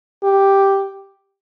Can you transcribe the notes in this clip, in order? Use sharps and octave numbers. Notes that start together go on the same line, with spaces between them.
G4